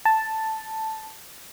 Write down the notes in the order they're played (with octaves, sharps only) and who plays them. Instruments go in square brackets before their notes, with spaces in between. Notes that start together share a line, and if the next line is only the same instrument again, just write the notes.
[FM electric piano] A5